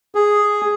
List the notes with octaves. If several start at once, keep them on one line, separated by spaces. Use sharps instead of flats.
G#4